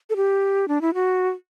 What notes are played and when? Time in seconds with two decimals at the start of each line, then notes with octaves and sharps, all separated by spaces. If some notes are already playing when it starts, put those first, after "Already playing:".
0.10 A4
0.16 G4
0.68 D4
0.81 E4
0.94 F#4